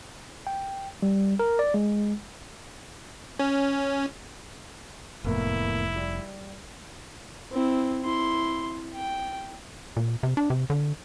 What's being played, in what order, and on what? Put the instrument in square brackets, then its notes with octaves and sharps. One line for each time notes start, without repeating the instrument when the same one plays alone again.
[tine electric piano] G5
G3
A#4
D5
G#3
[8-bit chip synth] C#4
[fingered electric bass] F1 [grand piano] E2 A2 A#3 [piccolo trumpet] E4
[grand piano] G3
[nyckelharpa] C4 E4
E4 C6
G5
[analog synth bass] A#2
C3
D4
C3
D3